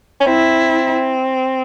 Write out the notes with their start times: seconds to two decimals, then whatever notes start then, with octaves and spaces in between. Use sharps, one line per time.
0.20 C#4
0.26 C4 E4